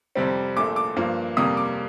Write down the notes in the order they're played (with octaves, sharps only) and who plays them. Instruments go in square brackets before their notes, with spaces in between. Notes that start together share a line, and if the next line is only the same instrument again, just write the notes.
[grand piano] F2 C3 G3 C4
A#1 A#2 A3 D6
D6
G2 F3 A#3
F2 C3 G3 A#3 D#6
D6